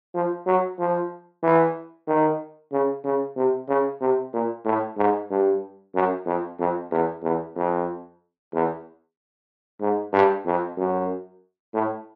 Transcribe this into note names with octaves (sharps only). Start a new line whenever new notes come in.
F3
F#3
F3
E3
D#3
C#3
C#3
C3
C#3
C3
A#2
A2
G#2
G2
F#2
F2
F2
E2
E2
F2
E2
G#2
G2
F2
F#2
A2